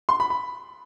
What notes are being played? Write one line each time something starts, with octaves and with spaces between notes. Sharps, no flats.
C6
B5
B5